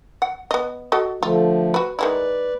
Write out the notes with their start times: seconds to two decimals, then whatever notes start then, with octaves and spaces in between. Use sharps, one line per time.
0.22 F#5
0.51 B3 D#5
0.92 F#4 A4 D#5
1.23 D3 F3 A3 F4
1.74 F#4 B4
1.99 D#3 G#3 E4 B4 D5